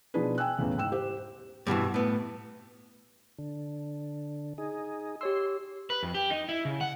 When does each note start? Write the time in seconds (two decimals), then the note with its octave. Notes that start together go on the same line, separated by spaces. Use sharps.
0.14 B2 F3 D4 D#4 G#4 B4
0.38 G5 G#5 E6 F#6
0.57 E2 A2 C#3 E3
0.78 G#2 G5 E6 E7
0.92 G4 C5
1.67 G2 B2 D#3 E3
1.94 A2 B3
3.39 D3
4.58 D#4 G#4
5.21 G4 C#5 C6 E6
5.90 B4
6.03 F2
6.15 G4
6.30 D#4
6.49 E4
6.65 C#3
6.81 F#5